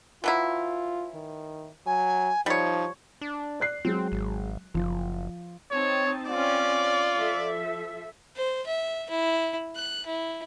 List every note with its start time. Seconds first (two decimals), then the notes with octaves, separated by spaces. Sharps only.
0.24 E3 F#3 E4 F4
1.14 D#3
1.86 F#3 G#5
2.46 F3 G3 D#4 C#5
3.21 D4
3.60 D5 F#6 C7
3.85 F#3 G#3 C4
4.12 G#1
4.74 F#1 F3
5.71 C4 D#4 C#5 A5
6.30 C4 C#4 F4 D5
7.15 F3 A4 E5
8.36 C5
8.67 E5
9.10 E4
9.76 F#6
10.06 E4